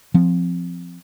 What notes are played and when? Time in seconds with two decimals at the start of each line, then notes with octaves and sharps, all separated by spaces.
0.14 F3 C4